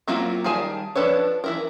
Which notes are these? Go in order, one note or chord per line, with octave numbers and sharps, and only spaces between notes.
F#3 A#3 C4 E4 F4
D#3 G3 G#4 G#5 A5
F3 D4 A4 B4 C#5
E3 E4 A#4